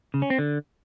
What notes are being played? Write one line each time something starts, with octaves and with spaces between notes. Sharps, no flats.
C#3
C#4
C4
D3